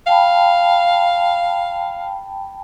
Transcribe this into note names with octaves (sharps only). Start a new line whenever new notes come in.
F5 G5 A5 B5